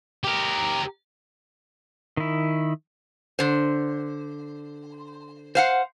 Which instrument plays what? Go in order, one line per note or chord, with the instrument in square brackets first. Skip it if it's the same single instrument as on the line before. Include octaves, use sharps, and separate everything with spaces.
[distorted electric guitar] G4 A#4
[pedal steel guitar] D#3 E4
[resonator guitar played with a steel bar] D3 C5
C5 F5 F#5